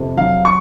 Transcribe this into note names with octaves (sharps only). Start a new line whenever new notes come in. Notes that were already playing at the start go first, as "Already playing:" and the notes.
Already playing: F2 C3
F#3 F5
C#6